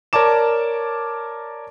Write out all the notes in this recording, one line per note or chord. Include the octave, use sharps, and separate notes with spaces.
A#4 C#5 D5 A5 D6 E7